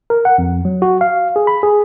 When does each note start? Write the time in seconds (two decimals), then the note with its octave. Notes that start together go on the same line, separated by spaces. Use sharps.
0.10 A#4
0.25 F#5
0.38 F2
0.65 F#3
0.82 F#4
1.01 F5
1.36 G#4
1.47 B5
1.63 G#4